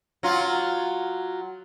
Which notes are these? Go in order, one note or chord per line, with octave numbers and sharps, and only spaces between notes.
F#3 F4